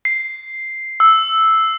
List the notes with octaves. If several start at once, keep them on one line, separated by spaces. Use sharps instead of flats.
C7
E6